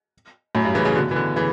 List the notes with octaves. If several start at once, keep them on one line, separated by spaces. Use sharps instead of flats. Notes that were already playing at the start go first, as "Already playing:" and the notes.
F#2 A2
G2
C#3 E3
C#3 E3
B2 D3
E3
B2 D3
C#3 E3